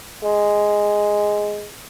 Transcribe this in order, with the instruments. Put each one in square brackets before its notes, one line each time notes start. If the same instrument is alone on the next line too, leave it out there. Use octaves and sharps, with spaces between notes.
[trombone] G#3